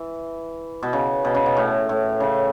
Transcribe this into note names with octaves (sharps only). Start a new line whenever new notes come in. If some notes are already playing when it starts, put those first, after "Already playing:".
Already playing: E3
B2
C#3
B2
C#3
B2
A2
A2
C#3